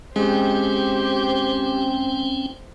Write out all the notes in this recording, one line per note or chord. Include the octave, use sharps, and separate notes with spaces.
G#3 C4 C#4 G4 C5 G5